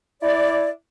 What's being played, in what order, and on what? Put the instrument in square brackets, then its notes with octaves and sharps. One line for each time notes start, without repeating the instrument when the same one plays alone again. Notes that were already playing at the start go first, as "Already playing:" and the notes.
[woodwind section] E4 D5